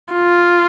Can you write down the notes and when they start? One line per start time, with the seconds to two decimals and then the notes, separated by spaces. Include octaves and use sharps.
0.14 F4